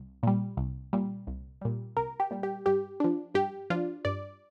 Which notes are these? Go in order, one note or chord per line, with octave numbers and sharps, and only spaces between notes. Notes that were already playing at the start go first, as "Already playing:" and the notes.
Already playing: C2
A#2 G3
C2
A#2 G3
C2
A#2 G3
C2 A#4
G4
A#2 G3
G4
G2 G4
F3 D4
G2 G4
F3 D4 F4
G2 D5